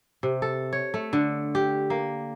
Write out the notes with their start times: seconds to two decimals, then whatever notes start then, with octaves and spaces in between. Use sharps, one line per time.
0.23 C3
0.42 A4
0.73 C#5
0.94 A3
1.13 D3
1.55 G4
1.90 A#3